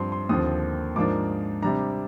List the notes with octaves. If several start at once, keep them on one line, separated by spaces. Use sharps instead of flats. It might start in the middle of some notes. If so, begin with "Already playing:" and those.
Already playing: G2 F3 C4 C6
C6
D#2 D3 F3 C4 D#6
G#2 F3 A#3 D4 D6
C3 G3 D4 A#5